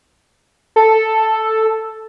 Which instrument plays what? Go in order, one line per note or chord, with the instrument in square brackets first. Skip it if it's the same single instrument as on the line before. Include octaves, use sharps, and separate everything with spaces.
[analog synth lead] A4